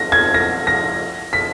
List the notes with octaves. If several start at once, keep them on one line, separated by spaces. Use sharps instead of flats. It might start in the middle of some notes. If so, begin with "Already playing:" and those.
Already playing: A#6
G#6
A#6
A#6
B6